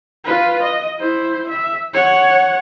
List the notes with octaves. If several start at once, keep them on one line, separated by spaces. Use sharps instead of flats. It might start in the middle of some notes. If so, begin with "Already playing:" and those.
F4 B4
D#5
E4 C5
E5
C#5 F#5